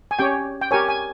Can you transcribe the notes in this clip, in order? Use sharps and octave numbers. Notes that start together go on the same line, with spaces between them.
G#5
C#4 G4 C#5 G5
G5
G4 A#4 C#5 G#5
G#5